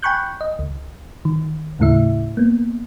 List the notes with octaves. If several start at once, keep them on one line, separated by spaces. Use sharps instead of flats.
G5 G#5 B5 C#6 F#6 G6
D#5
C#2
D#3
D#2 A2 C#3 A3 E4 E5
A#3 B3